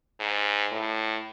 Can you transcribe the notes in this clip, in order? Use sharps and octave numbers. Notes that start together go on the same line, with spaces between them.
G#2
A2